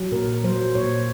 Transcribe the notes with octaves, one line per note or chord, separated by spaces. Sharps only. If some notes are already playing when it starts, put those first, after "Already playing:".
Already playing: F#3
A#2 A#4
F#3 C5
A#2 C#5